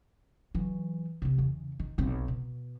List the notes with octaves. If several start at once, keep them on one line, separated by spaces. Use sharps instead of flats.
E3 F#3
C3 E3
E2 C#3
D#3
B1 C4
B2